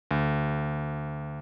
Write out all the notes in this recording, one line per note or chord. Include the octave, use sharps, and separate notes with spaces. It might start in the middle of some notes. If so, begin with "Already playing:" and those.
D2